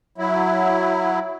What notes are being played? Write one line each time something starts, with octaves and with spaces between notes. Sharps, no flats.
F#3 E4